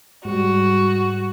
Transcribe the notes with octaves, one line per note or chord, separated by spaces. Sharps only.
G#2 G3 F#4